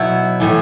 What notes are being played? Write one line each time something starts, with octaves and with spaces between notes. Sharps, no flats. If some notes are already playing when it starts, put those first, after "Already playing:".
Already playing: B2 F#3 E4
A2 E3